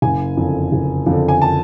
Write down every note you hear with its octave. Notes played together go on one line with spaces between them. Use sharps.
F#1 G#5
F2 D3
F#1
F2 D3
G#5
A5